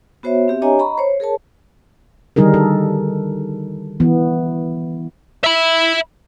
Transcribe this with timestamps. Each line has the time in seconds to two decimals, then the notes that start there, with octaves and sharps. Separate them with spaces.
0.23 B3 F#4 C5 C#5 E5
0.48 C4 G4 E5
0.62 D4 G4 C#5 D#5 G#5 A#5
0.79 D#5 A#5 B5 C#6
0.98 C5 C#5
1.20 G#4 A#4 C#5 A5
2.36 D3 D#3 G3 D#4 G#4 A#4
2.54 A4
4.00 E3 B3
5.44 E5 B5